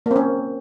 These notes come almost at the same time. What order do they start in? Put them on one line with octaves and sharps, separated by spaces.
A#3 C4 C#4